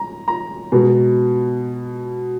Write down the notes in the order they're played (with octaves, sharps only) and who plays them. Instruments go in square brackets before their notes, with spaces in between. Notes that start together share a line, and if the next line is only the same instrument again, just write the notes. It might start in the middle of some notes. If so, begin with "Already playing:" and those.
Already playing: [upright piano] A#5
A#5
B2 G#3 B3